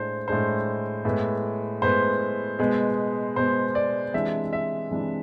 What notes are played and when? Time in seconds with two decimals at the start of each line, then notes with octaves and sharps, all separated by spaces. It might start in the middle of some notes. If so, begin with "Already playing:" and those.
Already playing: A2 G#3 D4 C5
0.28 A2 G#3 D4 C5
1.05 A2 G#3 B3
1.82 A2 G#3 B3 C5
2.59 B2 G#3 B3
3.36 B2 G#3 B3 C5
3.75 D5
4.14 C3 E3 G#3 D4 E5
4.53 E5
4.91 C3 E3 G#3 D4